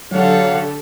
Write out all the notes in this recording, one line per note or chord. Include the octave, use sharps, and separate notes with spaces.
D3 F#3 G4 A4 C#5 F5 F#5